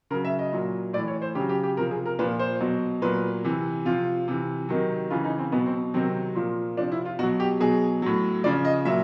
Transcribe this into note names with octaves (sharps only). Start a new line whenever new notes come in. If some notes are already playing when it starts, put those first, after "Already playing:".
C#3 F#3 A#4
E5
D#5
A#2 F#3
A2 D5
E3
C#5
C5
C#3 F#3 G4
G4
G4
C3 F3 A#4
G#4
A#4
A#2 F3 B4
C5
B2 F#3
A#2 F#3 B4
C3 E3
C3 F3 F4
C3 E3
C3 D#3 F#3
C#3 E3 F4
D#4
C4
B2 F#3 B3
C4
C3 D#3 F#3 C4
A#2 F3
C3 F3 D4
E4
F4
B2 F#3 F#4
G4
B2 F#3 G#4
A2 F#3
C#3 F3 D5
D#5
A#2 F#3 E5